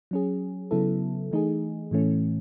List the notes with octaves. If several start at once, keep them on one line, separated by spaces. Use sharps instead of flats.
F#3 C#4 G#4
C#3 F#3 B3 E4 A4
E3 A3 D#4 G#4
A2 E3 A3 C#4